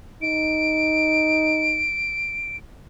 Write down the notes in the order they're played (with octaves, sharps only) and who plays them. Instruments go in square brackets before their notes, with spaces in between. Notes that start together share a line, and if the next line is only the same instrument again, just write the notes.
[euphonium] D#4 [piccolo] D7